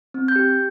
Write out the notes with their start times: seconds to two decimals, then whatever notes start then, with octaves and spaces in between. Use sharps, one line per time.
0.14 C4
0.28 G6
0.36 G4